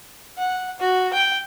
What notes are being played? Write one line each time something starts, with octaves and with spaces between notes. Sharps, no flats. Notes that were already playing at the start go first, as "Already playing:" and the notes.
F#5
F#4
G5